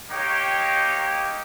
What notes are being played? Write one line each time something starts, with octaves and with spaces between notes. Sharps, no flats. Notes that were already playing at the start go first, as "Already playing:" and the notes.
A#3 D#4 G4 C#5 G5